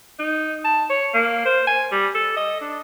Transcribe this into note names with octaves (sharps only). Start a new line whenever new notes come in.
D#4
A5
C#5
A#3
C5
G#5
G3
A4
D#5
D4